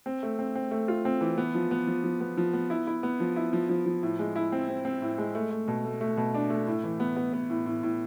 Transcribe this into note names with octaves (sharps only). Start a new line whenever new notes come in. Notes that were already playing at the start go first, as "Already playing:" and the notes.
C4
A3
C4
C4
A3
F4
C4
E3
B3
F3
B3
F3
F3
B3
F3
B3
E4
E4
B3
F3
E4
F3
F3
F3
A2
G#3
E4
C4
C4
C4
A2
G#3
A3
A3
B2
A3
A3
B2
D4
A3
A2
E3
B3
B3
B3
A2
A2
A2